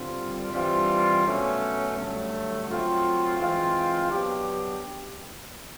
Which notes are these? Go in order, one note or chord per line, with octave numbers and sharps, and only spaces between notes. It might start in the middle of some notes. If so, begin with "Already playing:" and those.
Already playing: G2 D3 G3 C4 F4
G2 E3 G3 C4 F4
B2 F#3 A3 C#4
G2 D3 F#3 A3
F#3 A3 C4 F4
E3 G#3 C4 F4
F#3 B3 D4 G4